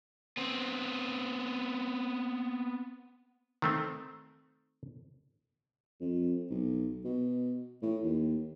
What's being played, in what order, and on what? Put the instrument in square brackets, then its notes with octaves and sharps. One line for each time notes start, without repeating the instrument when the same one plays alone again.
[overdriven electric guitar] B3 C4
[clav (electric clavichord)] D#3 A3 C4
[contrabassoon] F2
B1
B2
A2
D#2